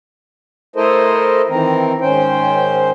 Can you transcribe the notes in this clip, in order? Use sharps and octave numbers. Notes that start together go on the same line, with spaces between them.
A3 E4 A4 A#4 C5 D#5
D#3 E3 C4 A#4
G#2 D#3 C#4 C5 G5